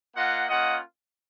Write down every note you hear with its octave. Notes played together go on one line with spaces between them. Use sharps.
A#3 F4 D#5 F#5
A#3 C#4 F4 D#5 F#5